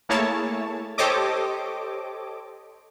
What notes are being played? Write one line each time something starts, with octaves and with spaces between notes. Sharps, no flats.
A3 A#3 E4 G#4 C#5 A5
G4 A4 C5 C#5 D#5 D6